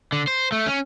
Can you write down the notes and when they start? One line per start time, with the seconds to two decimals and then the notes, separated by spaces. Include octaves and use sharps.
0.12 D3
0.28 C5
0.52 A3
0.66 C#4